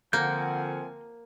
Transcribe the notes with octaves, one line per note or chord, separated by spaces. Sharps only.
D3 F3 A#3 C4 F#5 G#5 A#5 G6